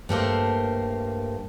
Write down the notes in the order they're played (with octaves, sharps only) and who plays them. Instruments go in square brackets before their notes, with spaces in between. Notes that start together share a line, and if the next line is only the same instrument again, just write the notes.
[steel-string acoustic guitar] G2 A3 A#3 C5